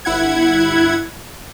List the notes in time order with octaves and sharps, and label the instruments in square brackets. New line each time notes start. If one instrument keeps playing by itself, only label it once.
[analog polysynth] G1 E4 F#5 G#6